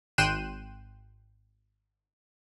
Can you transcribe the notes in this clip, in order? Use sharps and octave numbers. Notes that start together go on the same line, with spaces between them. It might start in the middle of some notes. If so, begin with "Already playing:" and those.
G#1 G5 C6 F#6 D#7 E7